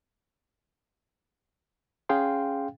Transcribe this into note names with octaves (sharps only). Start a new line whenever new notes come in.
C#4 G#4 F5 G5 C6